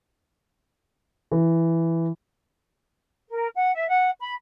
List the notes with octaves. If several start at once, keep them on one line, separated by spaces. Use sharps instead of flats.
E3
A#4
F#5
E5
F#5
B5